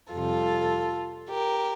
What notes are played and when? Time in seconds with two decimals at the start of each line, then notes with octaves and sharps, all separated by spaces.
0.12 F2 C3 G3 F4 A4
1.29 G4 A#4